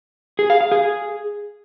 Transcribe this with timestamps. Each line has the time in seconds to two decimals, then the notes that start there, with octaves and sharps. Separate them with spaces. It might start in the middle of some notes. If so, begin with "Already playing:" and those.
0.39 G#4
0.50 F5
0.61 F5
0.72 G#4